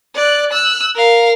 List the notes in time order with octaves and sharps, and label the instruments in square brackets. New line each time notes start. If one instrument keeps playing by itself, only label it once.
[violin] D5 F#6
E6 F#6
A#4 F5